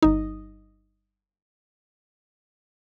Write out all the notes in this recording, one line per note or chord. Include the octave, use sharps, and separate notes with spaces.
G1 D#4